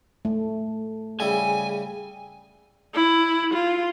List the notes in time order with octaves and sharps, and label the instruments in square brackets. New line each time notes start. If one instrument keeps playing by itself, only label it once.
[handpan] A3
[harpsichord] C#3 G3 E4 [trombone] G#4 [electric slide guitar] G#5
[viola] E4
F4